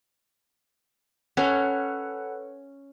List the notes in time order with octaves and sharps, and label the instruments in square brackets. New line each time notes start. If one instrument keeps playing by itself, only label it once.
[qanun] C#4 [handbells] A4 B4 F#5